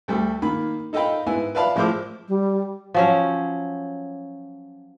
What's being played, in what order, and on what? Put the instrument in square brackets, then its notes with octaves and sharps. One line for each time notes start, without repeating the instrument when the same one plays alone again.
[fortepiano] D2 G3 A3
D#3 A#3 B5
D#4 A4 D#5 F5 G5 B5
G#2 B3 E4 G#5
B4 D5 E5 F5 A5 B5
A2 F3 G#3 E4 C5 D6
[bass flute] G3
[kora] F3 F#3 C#4